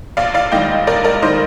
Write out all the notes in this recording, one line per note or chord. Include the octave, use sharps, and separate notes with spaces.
A#1 D5 F5
D5 F5
G#2 D#3 G3 D#5 G5
A#1 A#4 D5
A#4 D5
D#3 G3 C5 D#5